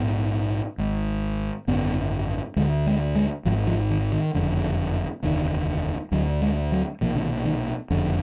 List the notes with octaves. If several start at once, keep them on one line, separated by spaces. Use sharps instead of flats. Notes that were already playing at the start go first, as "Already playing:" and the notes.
Already playing: A#1 G#2 B3
G#1 G#2
G#1 F#2 D3 B3
D2 D3 G#3
G#3
G#3
G#1 G#2 F3
F3
D#3
D#3
F#1 F2 D3
F1 D#2 D3 D#3
D2 D3 F#3
G#3
F#3
B1 A#2 F3
D3
D#3
D#3
F#1 F2 D3